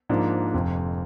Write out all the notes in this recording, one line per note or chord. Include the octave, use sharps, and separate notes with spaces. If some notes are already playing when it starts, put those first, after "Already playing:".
G#2 F3 A#3 D4
F1 F2 C3